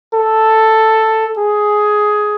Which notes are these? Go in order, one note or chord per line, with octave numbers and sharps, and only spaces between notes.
A4
G#4